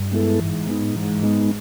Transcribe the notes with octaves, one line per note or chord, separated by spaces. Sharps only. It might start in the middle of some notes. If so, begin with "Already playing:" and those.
Already playing: G2
G#3 B3 E4 A4
G#2 E3
G#3 B3 D#4
G#2 E3
G#3 B3 D#4